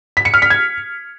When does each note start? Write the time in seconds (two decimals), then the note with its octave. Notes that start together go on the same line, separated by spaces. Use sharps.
0.17 B6
0.25 C#7
0.34 F6
0.42 B6
0.50 G#6